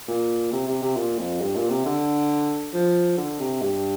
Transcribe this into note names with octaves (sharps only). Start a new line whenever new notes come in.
A#2
C3
C3
C3
A#2
F2
G2
A#2
C3
D3
F3
D3
C3
G2